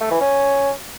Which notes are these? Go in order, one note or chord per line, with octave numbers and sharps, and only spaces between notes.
A3
E3
C#4